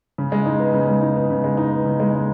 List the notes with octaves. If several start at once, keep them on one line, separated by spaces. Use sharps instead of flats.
C#3
G#3
D#4
B3
C#3
G#3
D#4
B3
C#3
G#3
D#4
B3
C#3
G#3
D#4